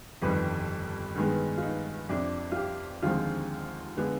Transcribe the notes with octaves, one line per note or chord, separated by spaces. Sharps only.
G1 F2 D#3 G3 B4
G2 D#3 G#3 B3
F4
D#4
F2 C3 F3 D4
F4
G4
D#2 D3 F3 G#3 C4 F4
D3 G#3 B3